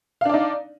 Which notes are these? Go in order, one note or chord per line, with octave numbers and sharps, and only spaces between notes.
D4 D#4 D5 F5